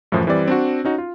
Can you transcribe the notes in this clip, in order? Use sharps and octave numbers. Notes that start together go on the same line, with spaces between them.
F#2 A2 E3 F3
E3 G3 C4 D5
C4 D4 F#4
C#4 D#4 F#4
F4